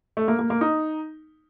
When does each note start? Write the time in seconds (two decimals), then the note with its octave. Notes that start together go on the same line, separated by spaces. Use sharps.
0.17 A3
0.28 A#3
0.39 A#3
0.50 A#3
0.61 D#4